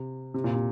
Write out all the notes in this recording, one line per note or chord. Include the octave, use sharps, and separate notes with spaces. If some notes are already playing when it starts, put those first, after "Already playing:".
Already playing: C3
C3
A#2
C3